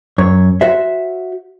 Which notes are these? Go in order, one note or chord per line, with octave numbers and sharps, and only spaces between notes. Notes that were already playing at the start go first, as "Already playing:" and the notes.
F#2 C#5
F#4 C5 E5